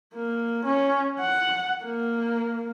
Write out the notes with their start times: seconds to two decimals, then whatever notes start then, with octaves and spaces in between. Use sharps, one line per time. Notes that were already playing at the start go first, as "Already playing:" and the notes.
0.15 A#3
0.65 C#4
1.20 F#5
1.84 A#3